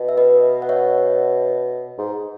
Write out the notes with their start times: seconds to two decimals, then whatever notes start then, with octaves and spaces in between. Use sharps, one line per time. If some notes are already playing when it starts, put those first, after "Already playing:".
Already playing: B2
0.09 E5
0.17 B4 D#5
0.62 F#5
0.69 C#5 E5
1.98 G#2